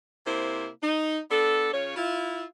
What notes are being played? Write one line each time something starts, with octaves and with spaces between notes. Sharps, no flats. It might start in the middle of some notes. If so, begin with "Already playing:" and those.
C3 A#3 E4 C5
D#4
B3 D4 A4
C#3 F4 C#5
E4 F4